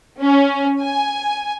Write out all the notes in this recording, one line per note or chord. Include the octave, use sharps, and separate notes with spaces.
C#4
G#5